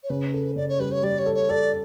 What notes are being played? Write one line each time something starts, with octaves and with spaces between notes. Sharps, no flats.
C#5
C#3 B4
A4
C#3 D5
C#5
G3 B4
C#5
G3 D5
C#5
A4
C#5
A4 D5